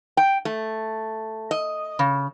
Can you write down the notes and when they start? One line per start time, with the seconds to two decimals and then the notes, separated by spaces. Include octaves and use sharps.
0.17 G5
0.45 A3
1.51 D#5
1.99 C#3